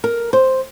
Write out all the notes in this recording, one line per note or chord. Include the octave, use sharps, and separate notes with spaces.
A#4
C5